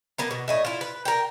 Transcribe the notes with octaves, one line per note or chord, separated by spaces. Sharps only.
A#3 B3 A5
B2
A2 D#5 E5
E4 F4
B4
A#4 G5